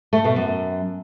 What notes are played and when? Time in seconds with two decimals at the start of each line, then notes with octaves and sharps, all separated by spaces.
0.13 A3
0.24 B2
0.36 F#2